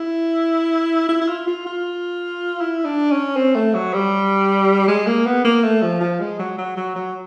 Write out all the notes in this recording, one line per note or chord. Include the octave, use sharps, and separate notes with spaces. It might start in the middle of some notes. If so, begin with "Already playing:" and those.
Already playing: E4
E4
E4
F4
F4
F4
E4
D4
C#4
C4
A3
F#3
G3
G#3
A#3
B3
A#3
A3
F3
F3
G#3
F#3
F#3
F#3
F#3